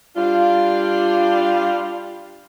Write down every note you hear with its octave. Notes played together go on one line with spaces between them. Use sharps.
G3 D4 F4